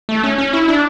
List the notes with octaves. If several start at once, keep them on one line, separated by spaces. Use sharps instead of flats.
A3
C#4
C#4
E4
D4